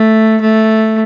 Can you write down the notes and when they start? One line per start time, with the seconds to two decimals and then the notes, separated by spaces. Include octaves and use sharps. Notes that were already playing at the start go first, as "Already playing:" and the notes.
Already playing: A3
0.41 A3